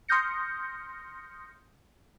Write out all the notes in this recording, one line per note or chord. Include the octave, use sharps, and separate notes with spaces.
C6 D#6 F6 G6 A#6 C#7